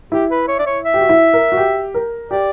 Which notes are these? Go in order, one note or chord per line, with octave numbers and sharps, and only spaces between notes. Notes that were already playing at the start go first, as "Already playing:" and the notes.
E4 G4
B4
C#5
D5
C#5
E5
G4
F#4
E4
A#4
F#4
G4
A#4
G4 D5